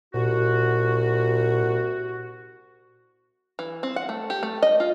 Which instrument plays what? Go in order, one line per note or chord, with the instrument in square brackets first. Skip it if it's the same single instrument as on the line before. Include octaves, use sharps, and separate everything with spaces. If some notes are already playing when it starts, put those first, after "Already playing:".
[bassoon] C2 [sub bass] A#2 [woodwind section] F#4
[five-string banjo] E3
C4
F#5
A3
G4
A3
D#5
F4